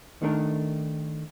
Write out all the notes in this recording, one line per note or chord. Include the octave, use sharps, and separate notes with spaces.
D#3 A3 D4 A#4